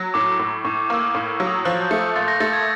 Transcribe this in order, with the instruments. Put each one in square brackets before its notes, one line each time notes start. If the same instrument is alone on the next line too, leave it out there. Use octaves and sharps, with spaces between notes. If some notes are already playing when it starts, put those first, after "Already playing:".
Already playing: [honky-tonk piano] F#3
[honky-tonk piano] A2 [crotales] D6
[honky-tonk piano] A2
[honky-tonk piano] A2 [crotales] C#6
[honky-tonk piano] A#3 [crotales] E6
[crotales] D#6
[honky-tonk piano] A2 [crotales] D6
[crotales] D#6
[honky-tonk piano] F#3
[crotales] D#6
E6
[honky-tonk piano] F3 [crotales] F#6
[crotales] G6
[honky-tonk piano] A3
[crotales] G6
[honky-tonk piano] A#2 [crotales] A6
[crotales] A#6
[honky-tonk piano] A3 [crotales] A6
[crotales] G#6